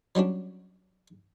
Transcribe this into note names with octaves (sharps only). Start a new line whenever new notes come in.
F#3 G3 C#4 D4